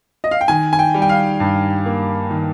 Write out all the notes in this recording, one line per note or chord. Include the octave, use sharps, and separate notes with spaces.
D#5
F5
G5
D#3 G#5
G#5
G5
G3
G5
F5
G2
A#3
D#3